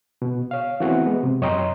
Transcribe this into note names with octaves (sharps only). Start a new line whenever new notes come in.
B2
C#5 F5
E3 A3 B3 C4 F#4
G#3 B3
C3
F#2 C#5 D#5 G5 A#5 C6